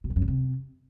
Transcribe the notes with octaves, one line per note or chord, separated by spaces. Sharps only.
B2
F2
F#2
C#3
C3